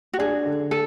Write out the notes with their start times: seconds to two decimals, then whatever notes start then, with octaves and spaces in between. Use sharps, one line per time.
0.13 F#4
0.19 D4 G#4
0.45 D3
0.71 A4